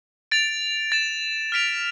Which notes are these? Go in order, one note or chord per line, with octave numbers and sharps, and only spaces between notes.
A6 D7 F7
A6 E7
F6 B6 D7 F7